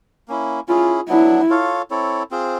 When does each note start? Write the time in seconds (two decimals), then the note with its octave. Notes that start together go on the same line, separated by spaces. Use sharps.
0.28 A#3 C#4 E4
0.68 C#4 E4 F4 G#4
1.09 F#3 B3 D4 E4
1.50 F4 A4 C#5 F5
1.90 C4 E4 A4 C#5
2.31 C4 F4 G#4 C5